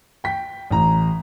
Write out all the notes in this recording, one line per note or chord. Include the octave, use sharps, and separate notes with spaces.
G5 B6
A1 A#5